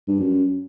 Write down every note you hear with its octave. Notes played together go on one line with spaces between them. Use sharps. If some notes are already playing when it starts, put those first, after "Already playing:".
G2
F#2